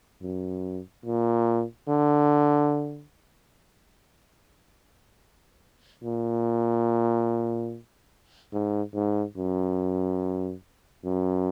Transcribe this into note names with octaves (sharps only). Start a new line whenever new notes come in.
F#2
A#2
D3
A#2
G#2
G#2
F#2
F#2